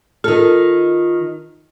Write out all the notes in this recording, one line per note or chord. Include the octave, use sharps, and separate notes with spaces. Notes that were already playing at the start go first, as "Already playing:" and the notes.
D#3 F4 A4